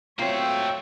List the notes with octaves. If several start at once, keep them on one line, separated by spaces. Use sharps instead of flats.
A2 F#3 A#3 C4 F4 C#5 E5 G5